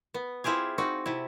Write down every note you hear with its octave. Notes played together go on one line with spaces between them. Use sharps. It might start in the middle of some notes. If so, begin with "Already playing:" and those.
B3
C4 E4 F4 G4 G#4
C4 D#4 F#4
C3 E4